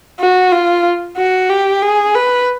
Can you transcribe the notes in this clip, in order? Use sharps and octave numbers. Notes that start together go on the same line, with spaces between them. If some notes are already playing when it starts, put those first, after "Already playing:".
F#4
F4
F#4
G4
G#4
B4